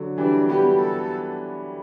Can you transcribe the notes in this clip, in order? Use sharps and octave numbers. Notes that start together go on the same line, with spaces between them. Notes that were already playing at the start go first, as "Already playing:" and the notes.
Already playing: D3 F#3
E3 G3 D4
G3 B3 G4
A4